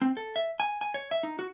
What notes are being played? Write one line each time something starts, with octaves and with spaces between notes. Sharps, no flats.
C4
A4
E5
G#5
G#5
C#5
E5
D#4
F#4